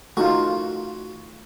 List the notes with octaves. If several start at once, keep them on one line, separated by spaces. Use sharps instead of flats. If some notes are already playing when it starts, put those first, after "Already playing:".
A3 D#4 F4 F#4